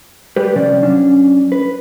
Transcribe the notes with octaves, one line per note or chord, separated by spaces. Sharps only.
G3 G4 B4
C3 F3 C#4 D5
F#3 C#4 D4
B4